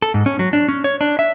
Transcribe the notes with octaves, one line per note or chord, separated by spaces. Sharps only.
A4
G#2
C#4
F#3
D4
C#4
C#5
D4
E5